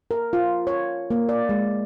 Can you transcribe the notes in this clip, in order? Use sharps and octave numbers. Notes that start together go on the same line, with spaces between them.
A#4
F4
C#5
A#3
D5
G#3